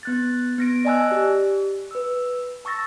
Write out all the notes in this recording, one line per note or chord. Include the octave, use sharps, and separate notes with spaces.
B3 F#6 A6
B3 A#6 D7
D5 D#5 G#5 A5 E6 F#6
G4
B4 E6
A5 C#6 E6 A6 A#6